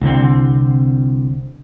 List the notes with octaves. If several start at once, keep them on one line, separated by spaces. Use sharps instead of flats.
C2 D3 C4